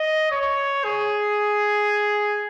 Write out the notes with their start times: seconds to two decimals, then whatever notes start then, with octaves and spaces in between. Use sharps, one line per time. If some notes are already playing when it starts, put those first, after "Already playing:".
Already playing: D#5
0.32 C#5
0.84 G#4